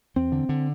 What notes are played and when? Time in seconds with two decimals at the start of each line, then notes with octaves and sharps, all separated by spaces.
0.16 E2 C4
0.32 D3
0.49 D3